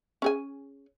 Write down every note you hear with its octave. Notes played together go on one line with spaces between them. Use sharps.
C#4 G#4 G#5